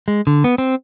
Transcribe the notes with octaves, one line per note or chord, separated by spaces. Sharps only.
G#3
D3
B3
C4